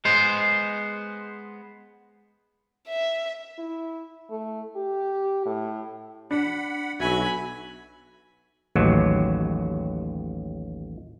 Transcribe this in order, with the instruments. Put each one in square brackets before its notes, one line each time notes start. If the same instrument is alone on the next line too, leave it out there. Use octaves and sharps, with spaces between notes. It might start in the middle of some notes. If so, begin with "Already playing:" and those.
[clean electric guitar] G#3 B3 C5
[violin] E5
[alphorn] E4
A3
G4
A2
[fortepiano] D4 [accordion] F#5 B5
[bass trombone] B1 [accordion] F#4 E5 [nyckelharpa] G#5 B5
[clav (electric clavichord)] A1 D#2 F#3